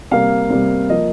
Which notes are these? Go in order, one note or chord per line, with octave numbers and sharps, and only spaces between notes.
C3 G3 A#3 F5
C3 G3 A#3
F3 A#3 D#5